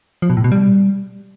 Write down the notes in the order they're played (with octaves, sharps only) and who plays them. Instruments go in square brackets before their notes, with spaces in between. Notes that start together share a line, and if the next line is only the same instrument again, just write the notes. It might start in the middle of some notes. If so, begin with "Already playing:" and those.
[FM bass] F3
B2
A2
B2
G3